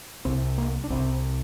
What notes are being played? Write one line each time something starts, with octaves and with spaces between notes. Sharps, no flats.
C2 C3 C4
A#3
D4
C2 C3 C4